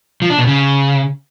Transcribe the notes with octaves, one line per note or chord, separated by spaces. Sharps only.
F3
D4
B2
C#3